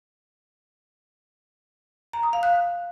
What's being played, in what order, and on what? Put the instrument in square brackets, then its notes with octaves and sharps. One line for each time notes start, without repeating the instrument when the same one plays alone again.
[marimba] A#5
D#6
F5
F#6